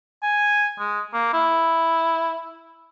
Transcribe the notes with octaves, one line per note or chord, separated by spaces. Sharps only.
G#5
G#3
A#3
E4